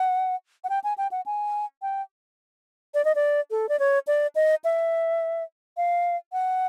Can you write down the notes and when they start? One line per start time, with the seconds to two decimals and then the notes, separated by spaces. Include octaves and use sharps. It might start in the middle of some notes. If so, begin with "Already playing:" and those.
Already playing: F#5
0.64 F#5
0.69 G5
0.84 G#5
0.98 G5
1.11 F#5
1.26 G#5
1.82 G5
2.94 D5
3.05 D#5
3.15 D5
3.51 A4
3.69 D5
3.79 C#5
4.07 D5
4.35 D#5
4.64 E5
5.77 F5
6.32 F#5